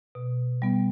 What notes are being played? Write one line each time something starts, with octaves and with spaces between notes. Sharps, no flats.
B2
G3 B3